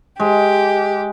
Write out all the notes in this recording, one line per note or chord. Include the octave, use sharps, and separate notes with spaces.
G#3 G4